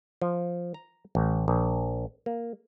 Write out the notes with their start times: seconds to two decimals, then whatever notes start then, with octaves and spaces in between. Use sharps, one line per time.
0.22 F3
0.74 A#5
1.15 A1
1.48 A#1
2.26 A#3